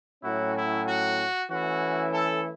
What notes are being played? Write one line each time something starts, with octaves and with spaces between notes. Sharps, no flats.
A2 F#3 C#4 E4 F#4
E4
F#4
E3 A3 C#4 E4 F#4
A4